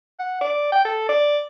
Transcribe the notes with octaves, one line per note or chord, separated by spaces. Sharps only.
F#5
D5
G5
A4
D5